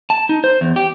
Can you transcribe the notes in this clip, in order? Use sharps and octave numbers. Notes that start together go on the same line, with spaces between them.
A5
D#4
C5
E2
G4